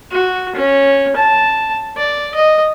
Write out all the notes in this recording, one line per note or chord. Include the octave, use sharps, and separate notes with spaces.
F#4
C#4
A5
D5
D#5